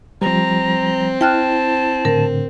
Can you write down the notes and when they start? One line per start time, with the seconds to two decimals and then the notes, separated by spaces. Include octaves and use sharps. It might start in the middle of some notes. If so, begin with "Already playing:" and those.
0.22 F3 G3 C4 A#5
1.21 E4 G5 A5 F6 F#6
2.05 A2 D3 A#4